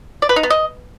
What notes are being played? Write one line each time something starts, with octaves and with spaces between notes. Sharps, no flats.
D5
B4
D#4
B3
D#5